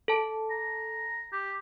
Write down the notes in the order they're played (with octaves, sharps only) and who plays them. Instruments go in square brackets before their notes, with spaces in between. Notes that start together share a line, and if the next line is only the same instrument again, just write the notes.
[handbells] A4 A5
[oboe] A#5
G4